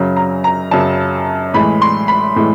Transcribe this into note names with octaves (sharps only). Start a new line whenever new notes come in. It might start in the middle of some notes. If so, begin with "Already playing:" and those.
Already playing: F#2 C#3 F#3
A#5
A#5
F#2 C#3 F#3 A5
A2 E3 G#3 B5
C6
B5
A2 E3 G#3